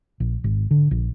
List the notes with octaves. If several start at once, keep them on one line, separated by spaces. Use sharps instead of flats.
A#1
G#1
D3
A#1